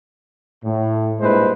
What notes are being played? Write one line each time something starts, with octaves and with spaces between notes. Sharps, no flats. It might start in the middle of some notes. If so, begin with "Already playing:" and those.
A2
G2 A#2 G#3 E4 B4 C5